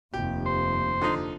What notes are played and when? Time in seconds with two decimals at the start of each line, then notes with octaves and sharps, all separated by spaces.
0.14 F1 D#2 G4
0.46 C5
1.01 D3 F3 D#4